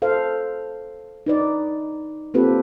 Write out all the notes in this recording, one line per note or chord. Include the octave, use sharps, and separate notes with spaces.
A4 C5 F5
D#4 B4 D5
A#3 C4 F4 G4 A4 B4